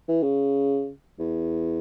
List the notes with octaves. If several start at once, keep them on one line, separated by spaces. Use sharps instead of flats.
E3
C#3
E2